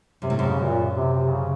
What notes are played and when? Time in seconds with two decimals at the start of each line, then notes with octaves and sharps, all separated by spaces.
0.22 F#2 C3
0.30 A2
0.35 F#2 C3
0.49 C#3
0.63 A#2
0.95 C3
1.13 C3
1.31 C#3